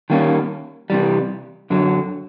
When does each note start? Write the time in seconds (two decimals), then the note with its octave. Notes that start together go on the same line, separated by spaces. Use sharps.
0.10 D#3 G3 A#3 C#4
0.90 C3 E3 G3
1.70 F#2 D3 F#3